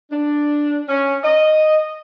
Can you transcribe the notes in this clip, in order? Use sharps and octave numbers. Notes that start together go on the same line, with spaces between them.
D4
C#4
D#5